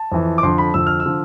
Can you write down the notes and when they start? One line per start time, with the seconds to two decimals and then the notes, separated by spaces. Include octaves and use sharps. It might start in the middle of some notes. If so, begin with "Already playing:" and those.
Already playing: A5
0.12 F2 E3
0.38 D6
0.43 F2 D3 F3 C6
0.58 B5
0.74 F2 D3 F3 E6
0.87 F6
1.00 E6
1.06 D3 F3